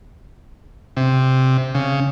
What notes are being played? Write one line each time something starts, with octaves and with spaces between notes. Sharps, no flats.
C3
C#3